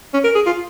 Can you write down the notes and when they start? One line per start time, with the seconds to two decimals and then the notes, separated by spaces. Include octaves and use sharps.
0.14 C#4
0.24 A#4
0.35 G#4
0.46 F4